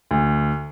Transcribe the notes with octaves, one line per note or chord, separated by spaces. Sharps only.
D2